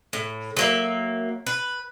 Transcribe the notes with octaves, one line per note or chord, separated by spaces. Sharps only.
A2
F#3 A#3 E5
B4